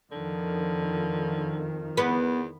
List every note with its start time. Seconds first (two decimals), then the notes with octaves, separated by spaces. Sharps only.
0.12 F2 D3 D#3 F3
1.97 E2 B3